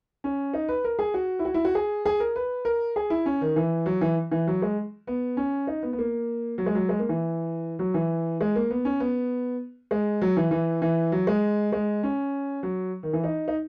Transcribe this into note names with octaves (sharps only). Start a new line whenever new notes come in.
C#4
D#4
B4
A#4
G#4
F#4
E4
F#4
E4
F#4
G#4
G#4
A#4
B4
A#4
G#4
E4
C#4
D#3
E3
F#3
E3
E3
F#3
G#3
B3
C#4
D#4
B3
B3
A#3
F#3
G#3
F#3
G#3
A#3
E3
F#3
E3
G#3
A#3
B3
C#4
B3
G#3
F#3
E3
E3
E3
F#3
G#3
G#3
C#4
F#3
D#3
E3
D#4
D#4